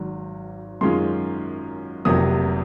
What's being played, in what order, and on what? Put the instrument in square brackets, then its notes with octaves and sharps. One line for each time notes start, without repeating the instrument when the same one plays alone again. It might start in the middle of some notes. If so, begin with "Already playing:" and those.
Already playing: [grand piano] G#1 G#2 F#3
F#2 D#3 G#3 C#4 F4 C6
F1 F2 C3 F#3 A#3 D#6